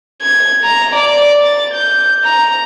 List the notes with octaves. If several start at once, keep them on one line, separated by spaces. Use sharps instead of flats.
G#6
A#5
D5
A6
G6
A#5